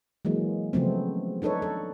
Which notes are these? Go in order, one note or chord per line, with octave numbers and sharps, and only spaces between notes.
E3 F#3 G#3 A#3
C#3 F3 F#3 A3 B3 C4
D4 D#4 A4 B4 C#5
A4